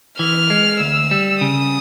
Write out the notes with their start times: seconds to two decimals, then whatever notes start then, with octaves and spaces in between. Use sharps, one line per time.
0.19 E3 F6
0.50 G#3
0.80 D2 E6
1.11 G3
1.41 C#3 D#6